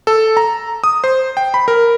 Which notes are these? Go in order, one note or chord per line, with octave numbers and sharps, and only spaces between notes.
A4
A#5
D#6
C5
G5
B5
A#4